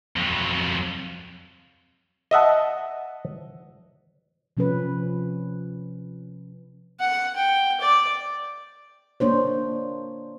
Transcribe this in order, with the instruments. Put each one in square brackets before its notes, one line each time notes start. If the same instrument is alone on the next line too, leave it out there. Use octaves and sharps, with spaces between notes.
[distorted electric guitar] F2 F#3
[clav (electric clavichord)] D#5 E5 F#5 A5
[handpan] C3 F3 C#4 F4 B4
[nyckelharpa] F#5
G5
D5
[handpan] A#3 D4 C5 C#5